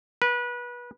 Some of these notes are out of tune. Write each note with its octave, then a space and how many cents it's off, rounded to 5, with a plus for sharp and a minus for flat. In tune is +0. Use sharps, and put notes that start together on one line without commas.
B4 -25